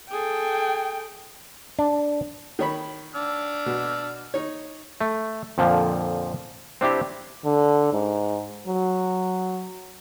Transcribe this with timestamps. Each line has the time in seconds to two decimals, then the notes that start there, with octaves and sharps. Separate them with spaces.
0.11 G#4 A4 G5
1.79 D4
2.59 D#3 C#5 B5
3.15 D4 E6 F6
3.66 B2
4.34 D#4 C#5
5.01 A3
5.58 F2 A#2 D3 F3
6.81 C4 D4 E4 G4
7.45 D3
7.93 G#2
8.67 F#3